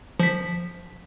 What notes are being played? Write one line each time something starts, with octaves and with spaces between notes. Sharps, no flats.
F3 B6